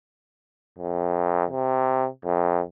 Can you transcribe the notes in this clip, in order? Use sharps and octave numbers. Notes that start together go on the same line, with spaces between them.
F2
C3
F2